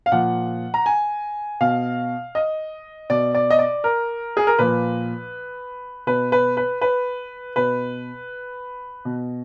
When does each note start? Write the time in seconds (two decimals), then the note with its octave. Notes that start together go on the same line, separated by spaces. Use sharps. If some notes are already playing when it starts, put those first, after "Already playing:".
0.06 F5
0.12 A#2 F3 F#5
0.74 A#5
0.86 G#5
1.60 B2 F5
2.35 D#5
3.10 B2 D5
3.35 D5
3.51 D#5
3.59 D5
3.84 A#4
4.37 G#4
4.47 A#4
4.59 A#2 F3 B4
6.07 B2 B4
6.32 B4
6.57 B4
6.81 B4
7.56 B2 B4
9.05 B2